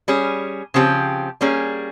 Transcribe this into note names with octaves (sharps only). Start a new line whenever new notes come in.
G3 C#4 G#4
C#3 F3 C4 G4
G3 A#3 C#4 G#4